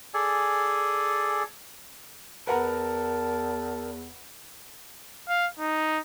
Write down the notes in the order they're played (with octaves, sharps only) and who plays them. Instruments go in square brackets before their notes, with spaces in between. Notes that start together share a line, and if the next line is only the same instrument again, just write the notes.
[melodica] G#4 A4 D5 G#5
[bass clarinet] E2 [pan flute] A#4 [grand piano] B4 F#5 A#5 [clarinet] A5
[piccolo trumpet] F5
D#4